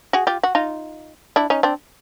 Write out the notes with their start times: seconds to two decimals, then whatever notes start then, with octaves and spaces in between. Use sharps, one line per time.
0.13 F#4 G#4
0.27 F4 G4
0.43 F#4
0.55 D#4 F4
1.36 D4 E4
1.50 C#4 D#4
1.63 C4 D4